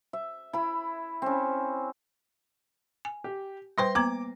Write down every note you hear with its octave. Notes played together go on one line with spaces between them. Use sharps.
E5
E4 B5
C4 C#4
G#5
G4
G3 B4 C5 G5 C6 A#6
A#3 B3 A#5 D6